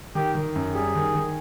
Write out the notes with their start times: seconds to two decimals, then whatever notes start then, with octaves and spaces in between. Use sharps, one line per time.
0.15 D#3 G4
0.35 D#3
0.56 F#2
0.74 G3 G#4
0.95 D#3
1.15 D#3